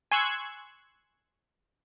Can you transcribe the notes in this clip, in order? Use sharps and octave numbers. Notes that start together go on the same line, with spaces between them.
G#5 C6 C#6 E6 F#6 G#6